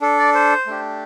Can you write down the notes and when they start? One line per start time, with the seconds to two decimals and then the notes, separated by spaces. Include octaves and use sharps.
0.01 D4 A4
0.19 D5
0.35 C5
0.67 A3 D4 G4